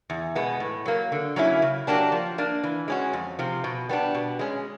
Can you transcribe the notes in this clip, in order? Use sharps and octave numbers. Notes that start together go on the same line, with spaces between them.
E2
B2 G#3 B3
A2
F#3 A#3
D3
F#3 A#3 C#4 E4
C#3
F#3 A#3 D4 G4
F3
A#3 D4
E3
G#3 C#4 F#4
F2
C3 F3
B2
G3 B3 D4
B2
G#3 C#4